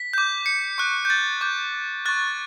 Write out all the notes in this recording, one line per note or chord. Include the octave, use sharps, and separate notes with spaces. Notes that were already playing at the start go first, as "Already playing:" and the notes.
Already playing: B6
D6 G6
C#7
C#6 F#6
G6
A6
D6 G6
C#6 F#6 A6